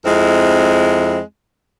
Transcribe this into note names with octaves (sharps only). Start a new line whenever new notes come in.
F2 G#3 C4 E4